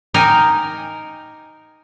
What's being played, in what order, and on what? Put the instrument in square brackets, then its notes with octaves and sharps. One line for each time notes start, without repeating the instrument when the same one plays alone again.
[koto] D#4 G4 A#4 G#5